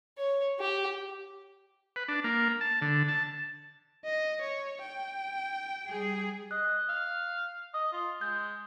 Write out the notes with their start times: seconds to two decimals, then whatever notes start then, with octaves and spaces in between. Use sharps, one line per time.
0.18 C#5
0.60 G4
1.96 B4
2.08 D4
2.24 A#3
2.61 A5
2.82 D3
3.08 A5
4.05 D#5
4.41 C#5
4.82 G5
5.88 G3 G#4
6.51 D#5 F#6
6.89 F5
7.74 D#5 D#6
7.93 F4
8.21 G#3 G6